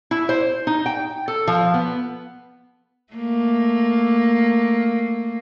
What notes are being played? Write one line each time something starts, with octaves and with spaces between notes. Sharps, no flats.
E4
C5
D#4
G5
A4
F3
B3
A3 A#3